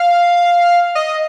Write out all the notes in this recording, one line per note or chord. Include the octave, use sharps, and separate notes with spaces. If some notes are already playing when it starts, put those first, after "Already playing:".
Already playing: F5
D#5